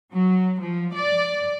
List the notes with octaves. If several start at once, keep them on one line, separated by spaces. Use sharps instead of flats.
F#3
F3
D5